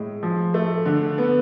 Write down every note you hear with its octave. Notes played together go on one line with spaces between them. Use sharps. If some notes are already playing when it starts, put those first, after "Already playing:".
Already playing: A2 G#3
F3
A3
D3
B3